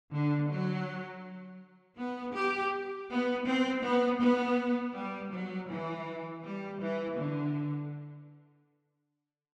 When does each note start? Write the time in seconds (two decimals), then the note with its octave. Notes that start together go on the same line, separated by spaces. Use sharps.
0.12 D3
0.49 F#3
1.98 B3
2.35 G4
3.09 B3
3.46 C4
3.84 B3
4.21 B3
4.96 G3
5.33 F#3
5.69 E3
6.44 G3
6.81 E3
7.18 D3